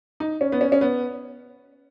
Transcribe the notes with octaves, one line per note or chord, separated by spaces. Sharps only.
D#4
C#4
B3
C#4
C#4
B3